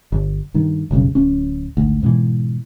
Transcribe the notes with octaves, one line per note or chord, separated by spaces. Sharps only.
G1
G2 D#3
F#1 B1 G2 C#3
D1 C#4
G#1 D2
G#2 B2 D3 E3